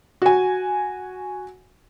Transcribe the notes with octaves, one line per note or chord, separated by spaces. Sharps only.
F#4 G#5